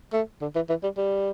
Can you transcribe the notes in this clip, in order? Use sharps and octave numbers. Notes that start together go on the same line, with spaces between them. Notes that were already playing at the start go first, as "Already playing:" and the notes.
A3
D3
E3
E3
G3
G3